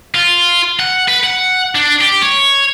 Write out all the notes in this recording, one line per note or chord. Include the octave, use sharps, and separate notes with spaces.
F4
F#5
B4
F#5
D4
G4
C#5